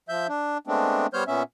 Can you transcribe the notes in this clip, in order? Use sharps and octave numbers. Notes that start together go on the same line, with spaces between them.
F3 E5 G6
D4
G#3 A3 B3 C4 D4
G3 B3 C5 C#5 F6 G6
A#2 B3 C#4 E5